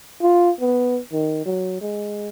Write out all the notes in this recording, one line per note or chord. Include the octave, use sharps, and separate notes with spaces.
F4
B3
D#3
F#3
G#3